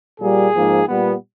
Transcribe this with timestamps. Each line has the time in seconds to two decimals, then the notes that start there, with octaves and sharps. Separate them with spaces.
0.19 A#2 G3 A#3 G#4
0.53 G#2 F3 A#3
0.87 A#2 G3 B3